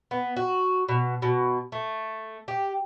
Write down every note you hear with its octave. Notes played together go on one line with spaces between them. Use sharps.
B3
F#4
B2
B2
A3
G4